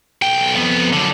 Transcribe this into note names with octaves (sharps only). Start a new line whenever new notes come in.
B1 G5
F2 B3
F#2 D3